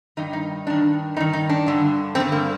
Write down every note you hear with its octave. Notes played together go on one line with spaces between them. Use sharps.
G2 D#3 D#4
D#4
G2 D#3 D4
G2 D#3 D#4
D#4
D4
G2 D3
G2 D3 C4
A#3